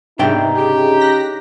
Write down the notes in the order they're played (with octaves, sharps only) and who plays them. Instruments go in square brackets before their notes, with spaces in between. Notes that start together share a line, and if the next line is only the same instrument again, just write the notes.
[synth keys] G#2 C3 B3 [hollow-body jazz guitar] D4 E5 G5 [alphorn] D#4
[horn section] C#3 G4 [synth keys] G#4
[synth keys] F#6 A#6 B6